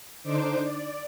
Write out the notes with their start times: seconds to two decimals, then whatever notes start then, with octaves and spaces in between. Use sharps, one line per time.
0.23 D3 D4 D#4 C5 D6
0.63 D5